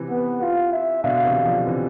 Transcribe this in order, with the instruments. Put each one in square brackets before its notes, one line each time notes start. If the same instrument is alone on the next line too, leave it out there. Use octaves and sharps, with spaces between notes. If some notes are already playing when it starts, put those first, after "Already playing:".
Already playing: [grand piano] C3 E3
[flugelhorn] B3
F4
E5
[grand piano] B2 D3 [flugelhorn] F5
[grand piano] C3 E3
D3 F3
C3 E3